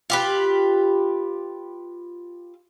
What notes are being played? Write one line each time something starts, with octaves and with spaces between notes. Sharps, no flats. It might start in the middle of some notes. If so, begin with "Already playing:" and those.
F4 G4 B4